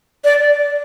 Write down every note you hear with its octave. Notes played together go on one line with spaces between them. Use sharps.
D5